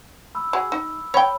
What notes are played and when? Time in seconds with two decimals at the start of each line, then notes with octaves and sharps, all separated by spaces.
0.35 B5 E6
0.53 F#4 G#4
0.72 D#4
1.14 C#5 G5 B5